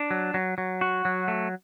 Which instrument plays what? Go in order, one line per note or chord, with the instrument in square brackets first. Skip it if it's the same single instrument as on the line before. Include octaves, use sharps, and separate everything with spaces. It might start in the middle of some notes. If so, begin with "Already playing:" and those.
Already playing: [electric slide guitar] D4
F#3
F#3
F#3
F#4
F#3
A3